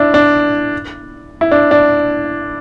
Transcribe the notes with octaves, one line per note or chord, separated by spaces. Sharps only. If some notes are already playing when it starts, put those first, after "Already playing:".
Already playing: D4 E4
D4
E4
D4
D4